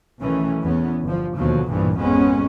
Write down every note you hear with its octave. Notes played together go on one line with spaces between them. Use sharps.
B1 D#3 E3 A3 C#4
E2 B3 C#4
G1 F3
D#2 B2 D3 F3 F#3
B1 G2 A#2 E3 F3
G#1 F2 G#3 B3 C#4